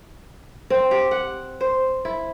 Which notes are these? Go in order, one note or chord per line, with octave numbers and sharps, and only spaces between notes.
C4
G4
F#5
C5
E4